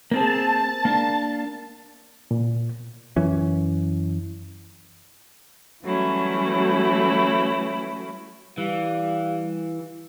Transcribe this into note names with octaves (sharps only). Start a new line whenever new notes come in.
A#3 C4 G#4 A5
A#3 D4
A#2
F#2 E3 C#4
E3 F#3 G3 A3 C#4 E4
E3 G3 G4 F5